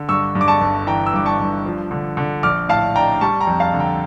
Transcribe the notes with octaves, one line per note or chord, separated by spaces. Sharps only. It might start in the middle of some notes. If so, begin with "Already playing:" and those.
Already playing: D3
G2 C#6 E6
G2
D6
A5 C#6
G1
E3 G5 A#5
E6
G2 D6
A5 C#6
G2
F3
D3
D3
A#1 D6 F6
A2 F5 A5
D4 G5 A#5
G3 A5 C#6
G5 A#5
F2
F5 A5
D3
G5 A#5